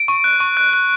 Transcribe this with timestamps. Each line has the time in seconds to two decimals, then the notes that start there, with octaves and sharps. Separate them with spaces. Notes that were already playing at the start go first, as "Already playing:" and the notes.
Already playing: D7
0.08 C#6
0.24 F#6
0.40 C#6
0.57 F#6
0.73 F#6